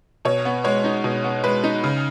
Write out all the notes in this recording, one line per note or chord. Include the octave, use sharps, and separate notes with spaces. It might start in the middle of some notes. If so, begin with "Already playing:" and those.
B2 C#5
B3
G#3 C#5
D#4
B2
B3
G#3 B4
D#4
C#3